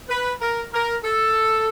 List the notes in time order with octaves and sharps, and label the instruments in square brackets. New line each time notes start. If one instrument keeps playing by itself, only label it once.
[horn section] B4
A#4
A#4
A4